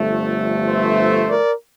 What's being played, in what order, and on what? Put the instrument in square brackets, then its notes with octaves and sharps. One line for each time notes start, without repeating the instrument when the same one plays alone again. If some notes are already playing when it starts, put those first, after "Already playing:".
Already playing: [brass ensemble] G1 G2 F3 A3
C5 E5
A#4 D5